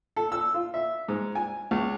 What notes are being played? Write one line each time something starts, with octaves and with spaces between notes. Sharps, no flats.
A4
E6
F4
E5
G#2
G#5
C#2